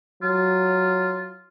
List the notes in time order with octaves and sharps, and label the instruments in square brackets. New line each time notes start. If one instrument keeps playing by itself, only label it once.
[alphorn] F#3 [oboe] F4